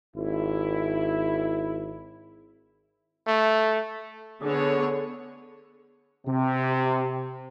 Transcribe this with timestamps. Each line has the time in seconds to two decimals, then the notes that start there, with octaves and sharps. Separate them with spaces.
0.16 G#1 E4
3.27 A3
4.44 D3 B3 G#4 C#5
6.27 C3